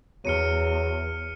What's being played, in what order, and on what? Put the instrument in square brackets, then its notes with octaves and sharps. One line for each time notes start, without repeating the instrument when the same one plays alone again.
[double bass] E2 [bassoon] F#3 [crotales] F6 C#7 D#7